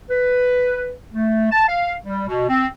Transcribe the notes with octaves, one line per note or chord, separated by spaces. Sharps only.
B4
A3
A5
F5
G3
B2
C4